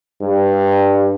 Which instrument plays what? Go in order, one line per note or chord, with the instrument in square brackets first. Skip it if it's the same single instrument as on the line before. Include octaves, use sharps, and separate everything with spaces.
[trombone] G2